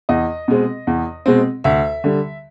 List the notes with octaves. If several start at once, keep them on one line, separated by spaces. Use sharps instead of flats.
E2 D#5
B2 G#3 C4
E2
B2 G#3 C4
D2 E5
D3 G3